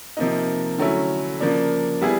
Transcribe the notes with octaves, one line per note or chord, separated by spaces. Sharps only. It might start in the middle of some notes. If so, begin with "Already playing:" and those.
C3 F3 A#3 D#4
D3 F#3 A3 C#4 E4
C#3 F3 A#3 D4
G3 B3 E4 G#4